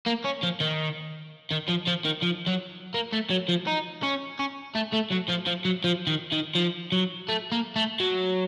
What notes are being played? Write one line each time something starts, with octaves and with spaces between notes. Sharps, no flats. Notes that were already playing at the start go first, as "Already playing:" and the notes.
A#3
C#4
F3
D#3
D#3
F3
F3
D#3
F3
F#3
A#3
A3
F#3
F3
D#4
C#4
C#4
A3
A3
F#3
F3
F3
F#3
F3
D#3
D#3
F3
F#3
A3
A#3
A3
F#3